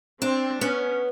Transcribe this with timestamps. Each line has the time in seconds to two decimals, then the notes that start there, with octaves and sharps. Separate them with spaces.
0.22 C4 D4
0.61 B3 C#4